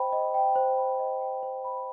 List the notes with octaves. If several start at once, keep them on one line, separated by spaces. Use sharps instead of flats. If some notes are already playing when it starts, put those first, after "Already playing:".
Already playing: C5 D#5 G5 B5
D#5
G5
C5
B5
D#5
G5
C5
B5